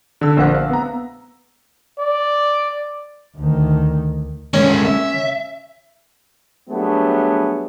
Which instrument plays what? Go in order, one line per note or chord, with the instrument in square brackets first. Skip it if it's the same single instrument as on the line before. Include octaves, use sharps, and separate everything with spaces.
[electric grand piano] D3 E6
A#1 A#3 C5 F#5 F#6
F5
B3 A#5
[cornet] D5
[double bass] D2 D#3
[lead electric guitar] G#3 A#3 [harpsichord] C#4
[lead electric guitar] E5
[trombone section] F#3 G3 A3 B3 D4 G#4